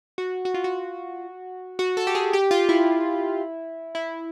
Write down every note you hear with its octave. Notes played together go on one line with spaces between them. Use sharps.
F#4
F#4
F4
F#4
F#4
A4
G4
G#4
G4
F4
E4
E4